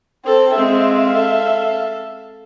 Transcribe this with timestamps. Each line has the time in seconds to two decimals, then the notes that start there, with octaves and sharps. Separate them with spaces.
0.26 C4 A4
0.57 G#3 C4 E5 F5
1.15 A4